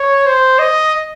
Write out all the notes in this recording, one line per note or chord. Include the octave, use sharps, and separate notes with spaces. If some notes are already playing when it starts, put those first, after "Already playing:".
Already playing: C#5
C5
D#5